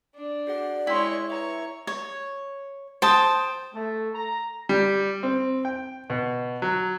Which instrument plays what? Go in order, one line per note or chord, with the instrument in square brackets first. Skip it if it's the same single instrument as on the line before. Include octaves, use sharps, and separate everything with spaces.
[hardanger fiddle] D4
[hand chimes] F#4 G#4 F#5 [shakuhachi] D5
[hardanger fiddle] G#3 C#5 [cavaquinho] E4 C6 [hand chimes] G5
[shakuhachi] B4 [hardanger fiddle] C#5 [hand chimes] E5 A#5
[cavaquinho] C#5
[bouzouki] C5 [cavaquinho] G5 A5 D#6
[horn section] A3
A#5
[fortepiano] G3
C4
G5
B2
F#3